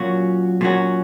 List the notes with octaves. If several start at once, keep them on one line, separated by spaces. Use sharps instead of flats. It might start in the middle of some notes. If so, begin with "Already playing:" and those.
Already playing: A#2 F#3 C#4 F#4
A#2 F#3 C#4 F#4